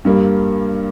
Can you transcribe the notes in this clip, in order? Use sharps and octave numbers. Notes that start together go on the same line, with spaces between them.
G2 G3 A#3